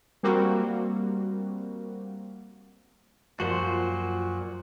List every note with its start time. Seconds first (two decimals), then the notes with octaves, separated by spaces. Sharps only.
0.23 G3 A#3 C4 F#4
3.40 F#2 A#2 F3 F#4 C5